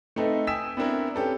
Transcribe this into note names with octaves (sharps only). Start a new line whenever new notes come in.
A3 C4 D#4 A4 B4 E5
G5 G#5 D#6 E6 B6 E7
B3 C4 D4 E4 A#4
C4 C#4 G4 A4 B4